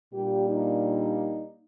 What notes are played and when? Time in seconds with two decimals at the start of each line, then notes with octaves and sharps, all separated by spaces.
0.14 A#2 G3 A#3 D4 G4
0.48 D#4